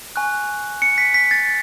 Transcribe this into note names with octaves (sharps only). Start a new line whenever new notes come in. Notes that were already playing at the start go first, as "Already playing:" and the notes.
G#5 C#6 F#6
C#7
B6
B6
A6